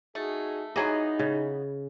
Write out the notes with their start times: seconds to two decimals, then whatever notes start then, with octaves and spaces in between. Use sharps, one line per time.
0.15 A3 D#4 F#4 G#4
0.76 E3 F#3 B3 D#4 G#4 D#5
1.19 C#3